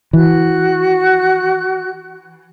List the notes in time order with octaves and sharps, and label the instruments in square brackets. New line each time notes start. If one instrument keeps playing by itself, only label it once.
[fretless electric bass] E3 [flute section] F#4 F#6